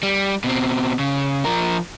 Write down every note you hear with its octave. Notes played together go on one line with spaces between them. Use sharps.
G3
B2 C4
C#3
F3 A#4